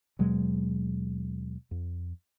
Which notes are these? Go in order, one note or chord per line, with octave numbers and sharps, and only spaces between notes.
D#2 B2 F#3 G#3
F2